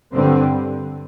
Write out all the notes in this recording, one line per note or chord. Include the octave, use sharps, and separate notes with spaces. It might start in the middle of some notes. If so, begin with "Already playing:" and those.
G2 D3 G3 C4